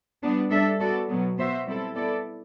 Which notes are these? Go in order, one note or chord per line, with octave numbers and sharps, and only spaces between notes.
G3 B3 D4
G3 D4 A4 E5
B3 F#4 A4 D5
B2 F#3 B3
B3 F#4 C5 E5
G3 C4 E4 A4
B3 E4 A4 D5